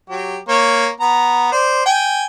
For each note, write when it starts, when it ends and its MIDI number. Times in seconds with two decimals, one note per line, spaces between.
0.10 0.38 54
0.10 0.38 67
0.49 0.89 58
0.49 0.89 73
1.00 1.49 59
1.00 1.49 82
1.52 1.83 72
1.52 1.83 74
1.86 2.26 79
1.86 2.26 80